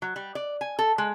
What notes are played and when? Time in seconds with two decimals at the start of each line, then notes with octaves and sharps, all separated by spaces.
0.02 F#3
0.16 G3
0.35 D5
0.61 G#5
0.79 A4
0.98 G#3